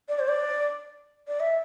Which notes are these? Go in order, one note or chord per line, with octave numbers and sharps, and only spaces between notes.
D5
C5
D5
D5
E5